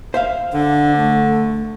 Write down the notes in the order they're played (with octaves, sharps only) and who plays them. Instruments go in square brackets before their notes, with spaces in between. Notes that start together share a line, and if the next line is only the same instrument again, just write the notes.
[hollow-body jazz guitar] C5 E5 F5
[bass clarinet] D3 [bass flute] D4
[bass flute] A3